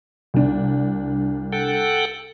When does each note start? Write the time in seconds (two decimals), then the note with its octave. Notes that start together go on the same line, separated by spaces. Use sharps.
0.34 C2 D4
1.52 A4 F#5 G5